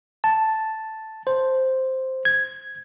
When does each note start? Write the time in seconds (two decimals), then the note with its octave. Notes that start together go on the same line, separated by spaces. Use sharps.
0.24 A5
1.27 C5
2.25 G#6